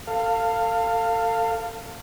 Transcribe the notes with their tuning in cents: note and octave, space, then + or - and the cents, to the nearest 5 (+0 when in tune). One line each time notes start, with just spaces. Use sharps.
A4 +35 F5 +0